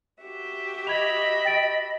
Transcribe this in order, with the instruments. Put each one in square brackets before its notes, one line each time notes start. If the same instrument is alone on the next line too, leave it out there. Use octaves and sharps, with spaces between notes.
[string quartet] F#4 G4 E5
[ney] D#5 [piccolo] B5 [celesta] G#6 F7
[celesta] G5 A6 D7